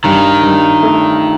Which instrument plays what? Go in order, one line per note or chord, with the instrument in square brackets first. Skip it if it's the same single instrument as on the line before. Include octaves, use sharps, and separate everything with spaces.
[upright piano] G2 [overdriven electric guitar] D#3
[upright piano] G2
A3